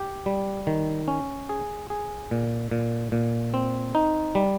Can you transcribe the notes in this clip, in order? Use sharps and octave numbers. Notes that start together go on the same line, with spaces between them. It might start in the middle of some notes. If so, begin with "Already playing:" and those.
Already playing: G4
G3
D#3
C#4
G#4
G#4
A#2
A#2
A#2
C4
D#4
G3